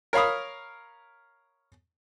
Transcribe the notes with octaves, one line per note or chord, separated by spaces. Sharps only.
A#4 C#5 F5 B5 D#6